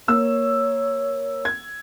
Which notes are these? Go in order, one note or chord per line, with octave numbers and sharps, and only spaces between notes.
A#3 C#5 E6
G#6